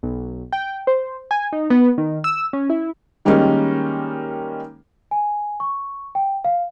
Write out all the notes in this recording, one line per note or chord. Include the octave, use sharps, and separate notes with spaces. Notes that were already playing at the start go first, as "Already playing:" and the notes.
B1
G5
C5
G#5
D#4
B3
D#3
E6
C#4
E4
D#3 G3 G#3 A#3 C#4 D#4
G#5
C#6
G5
F5